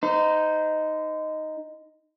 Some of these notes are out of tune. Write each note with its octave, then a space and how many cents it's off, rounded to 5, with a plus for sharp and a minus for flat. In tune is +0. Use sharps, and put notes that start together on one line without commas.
D#4 +0 C5 -35